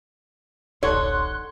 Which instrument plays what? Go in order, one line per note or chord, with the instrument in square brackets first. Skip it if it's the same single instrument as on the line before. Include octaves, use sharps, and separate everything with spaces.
[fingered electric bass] D1 A1 [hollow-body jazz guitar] D#4 A4 F#5 [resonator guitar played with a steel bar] C#5 [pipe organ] C6 F#6